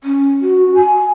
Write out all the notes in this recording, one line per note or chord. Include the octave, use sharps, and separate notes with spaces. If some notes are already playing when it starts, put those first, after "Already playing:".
C#4
F#4
G#5